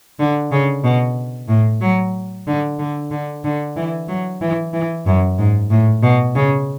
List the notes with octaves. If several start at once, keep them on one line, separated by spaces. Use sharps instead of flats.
D3
C#3
B2
A2
F#3
D3
D3
D3
D3
E3
F#3
E3
E3
F#2
G#2
A2
B2
C#3